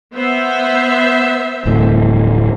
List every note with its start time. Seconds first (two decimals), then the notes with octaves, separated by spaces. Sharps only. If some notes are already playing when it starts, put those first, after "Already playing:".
0.15 B3 C5 E5
1.66 D1 E2 A2